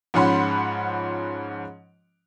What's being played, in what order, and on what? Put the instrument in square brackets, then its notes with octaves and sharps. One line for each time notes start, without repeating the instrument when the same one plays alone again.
[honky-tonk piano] G#2 F3 C#4 F#5 B5 C6